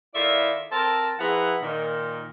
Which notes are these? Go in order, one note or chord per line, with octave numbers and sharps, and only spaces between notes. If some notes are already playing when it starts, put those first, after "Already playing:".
D#3 E4 F4 A4 D5 E5
C4 A4 A#4 A5
F3 E4 G#4 B4 F#5 A#5
A#2 D#3